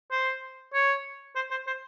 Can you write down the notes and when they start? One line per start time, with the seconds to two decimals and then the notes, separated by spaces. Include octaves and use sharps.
0.11 C5
0.74 C#5
1.35 C5
1.51 C5
1.67 C5